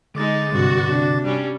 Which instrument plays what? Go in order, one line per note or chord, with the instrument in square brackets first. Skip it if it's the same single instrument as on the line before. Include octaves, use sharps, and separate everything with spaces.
[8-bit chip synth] D3 D6 A6 [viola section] G#3 D#4
[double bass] G2 C3 [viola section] F#4
[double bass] C3 D4
[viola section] G3 C#4